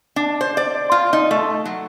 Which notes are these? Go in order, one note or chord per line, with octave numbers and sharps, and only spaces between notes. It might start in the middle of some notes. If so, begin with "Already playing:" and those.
D4
C5
D5
F4
D#4
A3
F#3